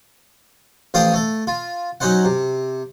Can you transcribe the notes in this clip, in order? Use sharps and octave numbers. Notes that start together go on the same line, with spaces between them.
A1 F3 C5 F5 G5 D#6
A3 A4
F4
F#3 C#4 D#4 C5 F#5
C3